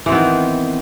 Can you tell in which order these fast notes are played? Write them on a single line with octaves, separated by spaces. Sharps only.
E3 C4 B3 D#3